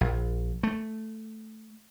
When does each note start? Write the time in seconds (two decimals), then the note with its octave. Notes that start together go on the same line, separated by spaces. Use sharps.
0.01 A#1
0.63 A3